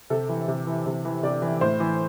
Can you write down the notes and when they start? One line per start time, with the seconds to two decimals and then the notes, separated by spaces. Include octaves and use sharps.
0.10 C3 A4
0.29 E3
0.48 C3
0.67 E3
0.86 C3
1.05 E3
1.23 C3 D5
1.42 E3
1.61 A2 C5
1.80 E3